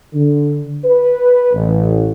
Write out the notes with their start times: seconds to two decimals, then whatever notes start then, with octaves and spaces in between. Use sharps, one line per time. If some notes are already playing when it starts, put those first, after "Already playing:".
0.13 D3
0.85 B4
1.53 A1